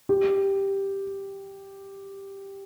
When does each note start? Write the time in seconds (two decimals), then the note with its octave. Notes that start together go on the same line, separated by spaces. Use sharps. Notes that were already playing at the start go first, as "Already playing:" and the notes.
0.09 G4